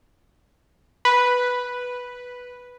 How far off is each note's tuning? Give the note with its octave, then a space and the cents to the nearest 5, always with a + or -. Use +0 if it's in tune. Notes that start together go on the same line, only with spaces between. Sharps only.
B4 -5